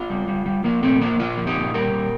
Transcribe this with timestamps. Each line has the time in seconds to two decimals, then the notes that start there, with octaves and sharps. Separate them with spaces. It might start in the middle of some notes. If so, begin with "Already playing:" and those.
Already playing: D4 F4
0.10 G3
0.28 G3
0.46 G3
0.64 F3 A#3 D4
0.83 A#2 A3 C4
1.01 F3 A#3 D4
1.19 A#2 D4 F4
1.38 F3
1.47 D#4 G4
1.56 A#2
1.74 G3 G4 A#4
1.93 A#2